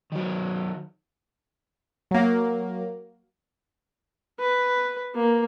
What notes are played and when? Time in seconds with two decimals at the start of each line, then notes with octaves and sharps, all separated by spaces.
0.12 D#3 F#3
2.11 F#3 A#3
4.40 B4
5.15 A#3